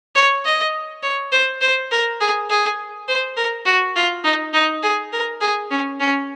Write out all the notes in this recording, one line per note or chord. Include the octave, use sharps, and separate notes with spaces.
C#5
D#5
C#5
C5
C5
A#4
G#4
G#4
C5
A#4
F#4
F4
D#4
D#4
G#4
A#4
G#4
C#4
C#4